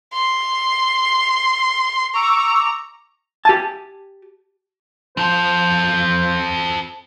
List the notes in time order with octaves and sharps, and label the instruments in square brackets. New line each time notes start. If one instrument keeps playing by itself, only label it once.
[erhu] C6
[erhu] A#5 [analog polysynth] C#6 D6 E6
[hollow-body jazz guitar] G4 G#5 A5
[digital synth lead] F3 [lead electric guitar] C4 A4 [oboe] C5